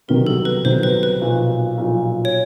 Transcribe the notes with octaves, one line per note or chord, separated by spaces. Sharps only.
C2 C3 D#3 F#3 B3 A#4
A4
B4
C2 C3 D#3 F#3 B3 C5
B4
B4
B1 A#2 F3
B1 A#2 F3
C#5